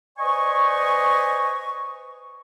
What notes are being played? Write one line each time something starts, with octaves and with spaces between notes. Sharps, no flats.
B4 C5 D5 D#5 G#5 C#6